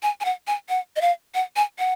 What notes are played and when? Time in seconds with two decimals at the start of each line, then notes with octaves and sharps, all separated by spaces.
0.03 G#5
0.21 G#5
0.25 F#5
0.47 G#5
0.69 F#5
0.96 D#5
1.01 F5
1.35 F#5
1.56 G#5
1.79 F#5